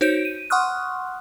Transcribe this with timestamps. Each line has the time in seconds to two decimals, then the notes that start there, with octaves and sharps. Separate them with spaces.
0.01 D#4 F#4 C5 C#5 G6 D7
0.25 D#7
0.50 F#5 C6 C#6 D#6 F6 F#6